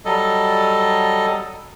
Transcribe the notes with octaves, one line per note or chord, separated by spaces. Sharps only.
F#3 G3 A4 D#5